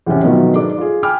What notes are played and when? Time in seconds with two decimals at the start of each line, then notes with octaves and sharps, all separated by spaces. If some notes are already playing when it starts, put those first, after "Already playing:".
0.06 E2 A2 C3 C#4
0.23 B2 D#3 F3 F#3 A3 B3
0.55 G#2 D4 A4 D6
0.78 F4 G#4
1.03 G5 G#5 B5 D6 F6